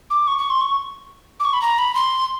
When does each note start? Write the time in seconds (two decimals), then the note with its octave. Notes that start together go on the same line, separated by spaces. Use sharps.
0.10 D6
0.27 C#6
0.38 C#6
0.50 C6
0.61 C#6
1.40 D6
1.45 C#6
1.53 B5
1.62 A#5
1.78 B5
1.95 C6